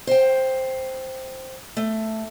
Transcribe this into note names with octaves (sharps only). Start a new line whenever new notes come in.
C5 G5
A3